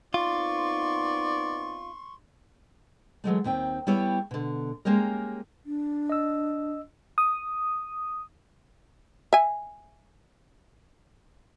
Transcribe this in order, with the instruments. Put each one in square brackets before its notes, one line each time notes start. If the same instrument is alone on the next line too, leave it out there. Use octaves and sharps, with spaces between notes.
[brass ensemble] B3 C4 D#4 [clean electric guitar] F4 [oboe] D5 [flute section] C6 C#6
[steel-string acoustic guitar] E3 F#3 G#3 A3
D#2 D#3 C4 G5
G3 B3 E4 G4 C#5
B2 D3
G#3 A#3 C#4 G4 A#4
[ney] D4
[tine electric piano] D#5 E6
[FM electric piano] D#6
[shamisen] E5 G#5